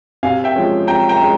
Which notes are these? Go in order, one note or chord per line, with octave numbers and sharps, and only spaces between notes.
C3 F5 G#5
E5 G5
F3 G#3 C#4
C3 G5 A#5
G5 A#5
G#3 C#4